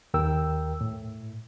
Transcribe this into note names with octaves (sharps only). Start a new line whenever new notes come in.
D#2 A#4 G5 E6
A2